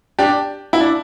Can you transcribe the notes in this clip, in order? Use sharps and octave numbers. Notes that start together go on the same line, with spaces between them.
D4 G4
E4
D4